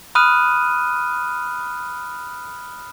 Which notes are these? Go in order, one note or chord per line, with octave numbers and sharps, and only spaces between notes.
B5 D#6 F6 F#6 D#7